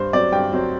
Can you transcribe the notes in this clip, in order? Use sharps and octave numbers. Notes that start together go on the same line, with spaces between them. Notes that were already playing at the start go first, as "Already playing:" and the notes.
Already playing: G2 C5
F#3 C4 D5
G2 G5
F#3 C4